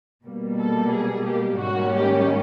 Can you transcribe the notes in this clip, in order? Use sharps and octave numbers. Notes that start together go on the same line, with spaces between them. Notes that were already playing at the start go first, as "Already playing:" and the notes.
B2 G3 A#3
A4
G#4
G4
G#2 D#3 G3 A#3 C#4 F#4
G4